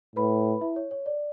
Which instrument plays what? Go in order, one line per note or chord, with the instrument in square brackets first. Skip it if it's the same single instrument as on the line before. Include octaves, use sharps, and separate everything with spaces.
[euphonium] A2 [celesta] B4 B5
[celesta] E4 E5
C#5
C#5
D5